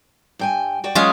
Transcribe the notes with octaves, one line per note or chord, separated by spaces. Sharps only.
G2 G5 G#5
F#4 D5 G5
F#3 G#3 C#4 F4